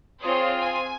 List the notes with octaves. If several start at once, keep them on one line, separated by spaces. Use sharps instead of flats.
C4 F4 G#4 C#5
G#5